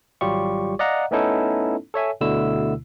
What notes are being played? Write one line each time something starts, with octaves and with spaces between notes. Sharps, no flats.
G#1 F#3 G3 F4 G4 C#6
D5 D#5 F5 F#5 A#5
A3 B3 C#4 D#4 E4 A4
A4 C#5 E5 G#5
D2 B2 D3 A3 E4 E6